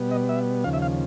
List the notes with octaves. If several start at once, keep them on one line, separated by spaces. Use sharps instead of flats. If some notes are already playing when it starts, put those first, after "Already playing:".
Already playing: B2 G3 B3
D#5
E5
D#2 C#3 F3 F5
E5
F5